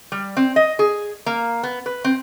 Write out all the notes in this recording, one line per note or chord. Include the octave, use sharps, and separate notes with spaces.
G3
C4
D#5
G#4
A#3
B3
B4
C4